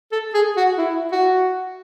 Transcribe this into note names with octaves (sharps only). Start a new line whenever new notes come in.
A4
G#4
F#4
E4
F#4